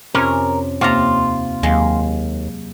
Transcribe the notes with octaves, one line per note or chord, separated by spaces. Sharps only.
F2 C3 C#4 A#4
D#2 C3 A#3 F4 A5 A#5
D#2 F#3 G#3 A#3 F5